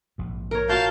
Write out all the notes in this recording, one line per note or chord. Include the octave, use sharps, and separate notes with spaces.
A#1 G#2
A#4 C#5
F4 F#4 F5 A5 G6